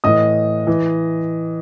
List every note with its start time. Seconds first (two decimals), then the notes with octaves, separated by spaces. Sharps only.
0.04 A2 E3 D#5 D#6
0.67 E3